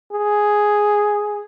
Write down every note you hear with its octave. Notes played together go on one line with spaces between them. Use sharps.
G#4